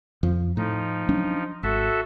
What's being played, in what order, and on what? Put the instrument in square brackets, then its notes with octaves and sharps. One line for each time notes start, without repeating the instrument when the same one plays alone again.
[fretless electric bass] F2 F3
[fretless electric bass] A2 [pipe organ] F3 D#4
[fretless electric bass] F#3 C#4 D4
[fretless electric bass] G#1 [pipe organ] F#4 A4 E5